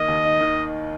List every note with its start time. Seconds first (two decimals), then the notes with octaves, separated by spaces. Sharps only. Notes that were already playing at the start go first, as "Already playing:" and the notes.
Already playing: D#3 A#3 D#5
0.08 D#2
0.25 D#4
0.41 D#3